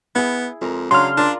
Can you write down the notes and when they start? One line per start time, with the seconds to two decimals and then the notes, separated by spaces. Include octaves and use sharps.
0.15 B3 E4 G#4
0.61 F2 G#3 A#4
0.91 C#3 F#3 D4 C6 F6
1.17 D4 F4 A#4 D5